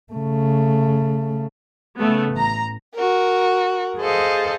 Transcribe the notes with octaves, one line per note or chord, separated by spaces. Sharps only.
C#3 A3
C#3 A3 B3
A1 A#5
F#4 A#4
G#4 A4 C5 D#5 F5